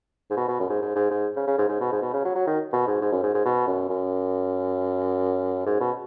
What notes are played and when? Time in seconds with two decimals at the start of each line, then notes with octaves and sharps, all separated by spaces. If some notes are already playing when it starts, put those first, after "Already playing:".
0.30 G#2
0.37 B2
0.48 B2
0.60 F#2
0.69 G#2
0.82 G#2
0.96 G#2
1.10 G#2
1.36 C#3
1.47 C#3
1.58 G#2
1.69 G#2
1.81 B2
1.92 G#2
2.02 B2
2.13 C#3
2.25 F#3
2.35 F#3
2.47 D#3
2.73 B2
2.87 G#2
3.01 G#2
3.12 F#2
3.23 G#2
3.34 G#2
3.45 B2
3.67 F#2
3.89 F#2
5.66 G#2
5.80 B2